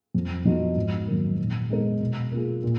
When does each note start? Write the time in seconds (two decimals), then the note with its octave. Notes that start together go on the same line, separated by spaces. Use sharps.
0.14 F2
0.45 F3 B3 D#4 F#4
0.76 G#2
1.07 D#3 F#3 A#3
1.39 A#2
1.70 G#3 B3 D#4 A#4
2.00 B2
2.32 A#3 F4 G#4
2.64 A#2